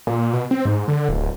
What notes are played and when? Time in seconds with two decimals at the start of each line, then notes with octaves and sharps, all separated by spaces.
0.07 A#2
0.33 B2
0.51 C4
0.65 G#2
0.88 D3
1.09 D1